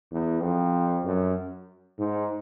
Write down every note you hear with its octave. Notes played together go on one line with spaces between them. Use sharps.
E2
F2
F#2
G#2